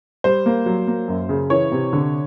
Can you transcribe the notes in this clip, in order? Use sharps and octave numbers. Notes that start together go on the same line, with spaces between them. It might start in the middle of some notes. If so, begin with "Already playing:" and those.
G3 C5
A#3
F#3
A#3
F#2
C#3
E3 C#5
C3
D3